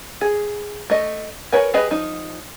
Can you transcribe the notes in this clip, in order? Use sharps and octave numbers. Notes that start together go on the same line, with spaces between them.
G#4
A3 D#5
F#4 A#4 B4 C#5 G#5
G4 G#4 B4 D#5
F3 D#4